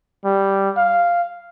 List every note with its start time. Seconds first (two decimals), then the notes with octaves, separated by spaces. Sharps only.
0.25 G3
0.77 F5